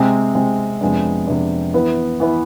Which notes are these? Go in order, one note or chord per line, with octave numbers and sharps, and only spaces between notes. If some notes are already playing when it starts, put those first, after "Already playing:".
Already playing: C3 G#3 C4
C3 G#3 C4
F2 C3 G#3 B3 D4
F2 C3 G#3 B3 D4
E3 B3 E4 B4
E3 B3 E4 B4